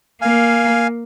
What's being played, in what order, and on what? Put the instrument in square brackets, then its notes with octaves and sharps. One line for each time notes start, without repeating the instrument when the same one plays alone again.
[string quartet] A#3 [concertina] F5 G#5